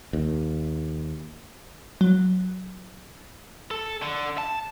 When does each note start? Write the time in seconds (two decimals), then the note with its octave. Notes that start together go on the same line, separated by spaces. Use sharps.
0.13 D#2
2.01 F#3
3.71 A4
4.02 D3
4.38 A5